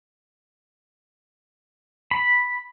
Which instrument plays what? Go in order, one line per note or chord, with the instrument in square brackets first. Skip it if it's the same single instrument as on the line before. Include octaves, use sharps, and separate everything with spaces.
[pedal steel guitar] B5